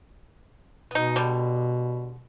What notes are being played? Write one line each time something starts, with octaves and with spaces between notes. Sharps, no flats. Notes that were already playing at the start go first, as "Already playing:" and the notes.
B2 B3 D#4
D3 G3